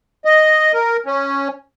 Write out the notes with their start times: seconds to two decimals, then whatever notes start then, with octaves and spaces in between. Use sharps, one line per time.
0.25 D#5
0.74 A#4
1.06 C#4